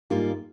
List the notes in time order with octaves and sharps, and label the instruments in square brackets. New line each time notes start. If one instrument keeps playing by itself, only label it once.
[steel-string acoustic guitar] G#2 G3 A#3 F4 [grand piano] D#4 G4